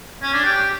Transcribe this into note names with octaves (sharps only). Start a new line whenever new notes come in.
C#4
D4
G4